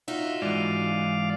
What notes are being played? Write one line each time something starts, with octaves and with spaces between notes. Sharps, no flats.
D#4 F4 F#4 E5
G#2 E3 D5 F5